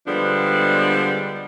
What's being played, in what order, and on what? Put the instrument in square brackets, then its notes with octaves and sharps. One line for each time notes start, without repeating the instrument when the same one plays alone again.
[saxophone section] D3 F3 G3 G#3 B3 D4